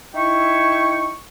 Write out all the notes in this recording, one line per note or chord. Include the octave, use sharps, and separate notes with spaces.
D#4 E4 E5 G5 C#6